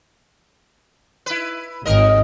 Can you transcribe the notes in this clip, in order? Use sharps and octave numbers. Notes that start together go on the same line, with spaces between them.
E4 B4
G#1 D#2 A#4 D#5